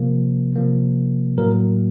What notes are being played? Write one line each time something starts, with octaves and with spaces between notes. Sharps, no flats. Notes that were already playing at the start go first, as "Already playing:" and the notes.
Already playing: C3 F3 A#3
C3 F3 A#3
A2 F#3 A#3 A#4